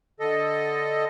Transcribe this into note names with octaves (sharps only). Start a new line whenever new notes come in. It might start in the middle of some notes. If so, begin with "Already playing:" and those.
D3 A4 D#5